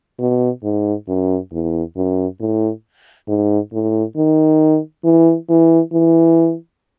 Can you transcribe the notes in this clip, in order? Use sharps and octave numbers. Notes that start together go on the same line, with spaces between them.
B2
G#2
F#2
E2
F#2
A2
G#2
A2
D#3
E3
E3
E3